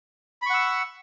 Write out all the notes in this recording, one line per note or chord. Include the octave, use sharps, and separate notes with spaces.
F#5 B5 C#6 E6